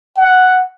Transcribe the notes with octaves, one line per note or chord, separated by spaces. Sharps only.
F#5